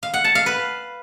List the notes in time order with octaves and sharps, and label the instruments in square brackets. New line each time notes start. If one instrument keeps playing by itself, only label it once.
[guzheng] F5
F#5
A5
F5
B4